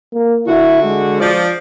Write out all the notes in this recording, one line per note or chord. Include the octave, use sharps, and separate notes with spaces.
A#3
D3 E4 F#4
G#3
F3 D5